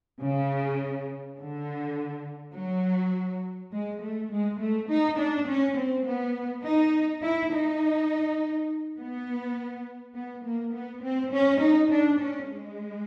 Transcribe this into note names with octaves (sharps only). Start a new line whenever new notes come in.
C#3
D3
F#3
G#3
A3
G#3
A3
D#4
D4
C#4
C4
B3
D#4
E4
D#4
B3
B3
A#3
B3
C4
C#4
D#4
D4
C#4
G#3